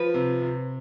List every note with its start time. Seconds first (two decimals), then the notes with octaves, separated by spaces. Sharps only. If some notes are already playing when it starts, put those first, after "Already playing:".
Already playing: F3 B4
0.14 C3
0.42 C3